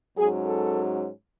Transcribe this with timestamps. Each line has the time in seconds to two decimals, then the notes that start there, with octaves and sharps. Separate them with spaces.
0.17 G#2 F#3 C#4 G#4
0.46 A4